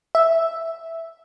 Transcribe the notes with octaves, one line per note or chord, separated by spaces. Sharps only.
E5